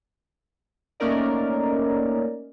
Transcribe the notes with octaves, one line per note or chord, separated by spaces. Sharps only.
A3 A#3 C#4 D#4 A#4 D5